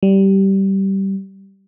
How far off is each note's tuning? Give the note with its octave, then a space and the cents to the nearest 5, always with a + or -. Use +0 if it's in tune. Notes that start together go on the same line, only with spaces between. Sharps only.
G3 -15